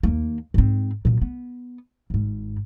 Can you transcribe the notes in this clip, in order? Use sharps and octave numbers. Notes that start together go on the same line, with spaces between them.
D#2 A#3
G#2 C4
F#2 A#2
B3
G#1 G#2